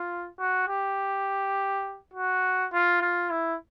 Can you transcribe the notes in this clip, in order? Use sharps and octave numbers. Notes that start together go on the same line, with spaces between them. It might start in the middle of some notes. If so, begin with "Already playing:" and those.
Already playing: F4
F#4
G4
F#4
F4
F4
E4